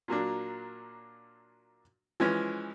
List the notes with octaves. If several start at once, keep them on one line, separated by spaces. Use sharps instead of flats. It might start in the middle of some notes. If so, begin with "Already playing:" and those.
A#2 F#3 A#3 D4
E3 F3 G#3 C#4